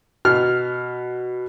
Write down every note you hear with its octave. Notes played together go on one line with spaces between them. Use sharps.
B2 F6